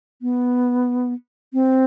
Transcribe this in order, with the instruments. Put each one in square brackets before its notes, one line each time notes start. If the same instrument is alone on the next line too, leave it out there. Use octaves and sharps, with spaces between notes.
[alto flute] B3
C4